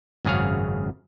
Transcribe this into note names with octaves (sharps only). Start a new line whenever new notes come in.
G#1 F#2 C#3 G#4 C#5 F5